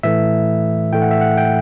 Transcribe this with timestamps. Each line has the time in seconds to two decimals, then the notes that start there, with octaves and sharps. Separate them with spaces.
0.03 A2 E3 A3 E5
0.93 A2 E3 A3 G5
1.02 F#5
1.11 E5
1.21 F#5
1.37 G5